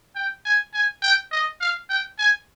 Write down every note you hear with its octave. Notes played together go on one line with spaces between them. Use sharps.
G5
G#5
G#5
G5
D#5
F5
G5
G#5